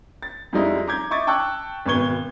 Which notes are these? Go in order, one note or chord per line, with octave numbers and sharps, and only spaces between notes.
A6
F2 F3 G3 G#3 D#4 E4
A#5 D6 G6 G#6
D#5 E5 C#6 D6 G#6 A6
G5 A5 C#6 E6 F#6
G#1 B2 B4 C#6 G#6 G7